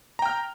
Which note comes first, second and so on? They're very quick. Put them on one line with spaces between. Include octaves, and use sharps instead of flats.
A#5 G5 F6